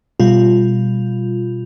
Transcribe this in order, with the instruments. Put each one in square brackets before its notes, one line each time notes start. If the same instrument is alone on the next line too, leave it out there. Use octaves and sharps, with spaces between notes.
[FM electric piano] B2 G3 F4